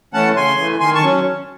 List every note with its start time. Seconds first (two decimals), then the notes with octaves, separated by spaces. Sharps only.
0.13 E3 A3 C#4 F#5 A5
0.36 C#3 G#5 C6
0.59 E3 A3
0.80 D#3 G#5 C6
0.94 A5 C#6
1.03 F#3 C#4